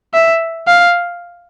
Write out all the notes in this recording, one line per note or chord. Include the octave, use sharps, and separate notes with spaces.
E5
F5